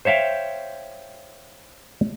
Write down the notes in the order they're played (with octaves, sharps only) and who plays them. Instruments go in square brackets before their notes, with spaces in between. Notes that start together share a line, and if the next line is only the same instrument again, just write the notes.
[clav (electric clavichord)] C5 C#5 E5 F5 G5